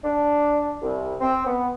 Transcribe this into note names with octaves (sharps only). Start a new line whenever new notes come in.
D4
C2
C4
B3